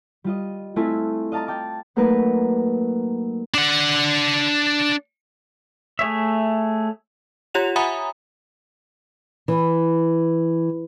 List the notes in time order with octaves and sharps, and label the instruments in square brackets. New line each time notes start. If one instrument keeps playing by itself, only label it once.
[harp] G3 F4 D#5
A3 C4 E4 F4 G#5 B6
D#5 F5 A5 A#5 D#6
G5 A5 D6 F6
F#3 A3 A#3 D#4 A#4 B4
[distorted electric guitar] D4 F#5
[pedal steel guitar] A3 G#4 C#5 E5
[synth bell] F4 G4 C#5 F#5 F7
E5 F#5 G#5 A#5 B5 D#6
[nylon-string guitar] E3